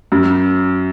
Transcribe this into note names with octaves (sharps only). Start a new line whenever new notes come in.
F#2